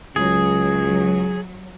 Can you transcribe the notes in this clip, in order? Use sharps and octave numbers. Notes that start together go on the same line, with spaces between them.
C#2 F#3 G#4